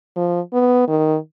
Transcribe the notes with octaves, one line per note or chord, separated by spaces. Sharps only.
F3
B3
D#3